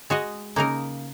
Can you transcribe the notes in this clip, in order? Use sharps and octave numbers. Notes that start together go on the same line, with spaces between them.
G#3 F#4 D#5
C#3 A#3 D#4 A#4